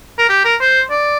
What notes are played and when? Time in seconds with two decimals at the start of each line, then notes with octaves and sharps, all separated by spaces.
0.18 A#4
0.29 G4
0.45 A#4
0.60 C5
0.91 D5